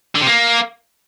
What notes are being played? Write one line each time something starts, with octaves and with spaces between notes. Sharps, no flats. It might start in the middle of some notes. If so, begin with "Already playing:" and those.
D3
C3
A#3